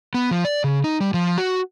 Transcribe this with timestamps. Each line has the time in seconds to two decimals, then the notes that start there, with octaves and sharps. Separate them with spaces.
0.14 B3
0.31 F3
0.45 D5
0.64 C#3
0.84 D#4
1.01 G3
1.14 F3
1.38 F#4